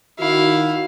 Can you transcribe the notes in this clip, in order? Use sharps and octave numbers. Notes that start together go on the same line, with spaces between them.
D#3 E4 F#4 F5